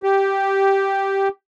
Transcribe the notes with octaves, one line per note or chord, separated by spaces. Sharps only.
G4